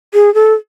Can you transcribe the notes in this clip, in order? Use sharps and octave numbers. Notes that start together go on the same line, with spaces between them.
G#4
A4